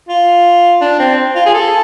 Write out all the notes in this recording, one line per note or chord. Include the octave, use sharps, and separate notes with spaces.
F4
D4
C4
F4
G#4
A4